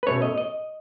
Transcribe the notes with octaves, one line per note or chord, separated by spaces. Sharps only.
B4
B2 A3 C#4 C#5
D#5
D#5